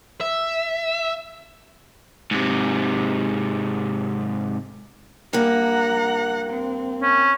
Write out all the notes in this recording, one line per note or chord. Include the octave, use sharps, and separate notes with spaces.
E5
G#2 C3
G2 A#3 F#5 A#5
C4
C#4